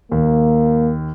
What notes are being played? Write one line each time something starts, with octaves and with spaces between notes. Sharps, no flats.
D#2 A#3